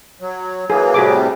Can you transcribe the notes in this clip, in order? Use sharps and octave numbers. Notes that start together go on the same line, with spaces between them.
F#3
E3 F#3 A#3 G#4
A2 C3 G3 F#4 G#4 D6